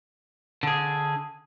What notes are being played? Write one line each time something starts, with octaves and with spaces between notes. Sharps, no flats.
D3 G#4